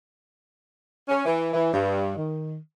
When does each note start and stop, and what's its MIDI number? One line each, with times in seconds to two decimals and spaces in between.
1.08 1.25 61
1.25 1.52 52
1.53 1.70 52
1.73 2.16 43
2.17 2.57 51